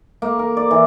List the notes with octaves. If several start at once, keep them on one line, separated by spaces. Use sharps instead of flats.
A#3
A#4
D5
E3